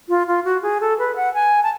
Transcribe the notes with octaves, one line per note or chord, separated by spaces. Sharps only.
F4
F4
F#4
G#4
A4
B4
F#5
G#5
A5